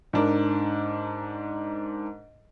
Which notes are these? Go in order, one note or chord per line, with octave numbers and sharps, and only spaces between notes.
G#2 D4 A#4